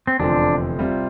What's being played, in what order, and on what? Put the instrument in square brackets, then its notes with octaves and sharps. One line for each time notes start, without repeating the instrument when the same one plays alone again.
[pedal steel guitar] C4
[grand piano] F1 E2 D3 F3 C4 [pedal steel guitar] D4
[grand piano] C2 C3 G3 C4 F4